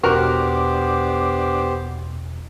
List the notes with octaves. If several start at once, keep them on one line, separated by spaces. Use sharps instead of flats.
E2 B2 B3 D4 F#4 G4 A#4 C5